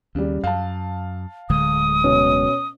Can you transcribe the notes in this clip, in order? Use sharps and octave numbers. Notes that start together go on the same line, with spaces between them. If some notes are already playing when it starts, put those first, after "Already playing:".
D#2 C#3 G3
F#2 F5 A5
D1 D3 G#3 D#6
B2 C#4